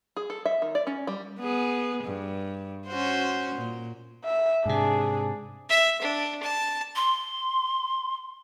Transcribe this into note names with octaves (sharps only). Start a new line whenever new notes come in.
G#4
A4
E5
D#3
D5
C#4
G3
B3 G#4
G2
C#4 F#4 C5
A#2
E5
G#2 C3 D4 G#4
E5
D4
A5
C6